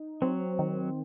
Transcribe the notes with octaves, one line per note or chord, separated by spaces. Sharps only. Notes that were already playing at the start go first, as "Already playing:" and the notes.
Already playing: D#4
F#3 C4
D#3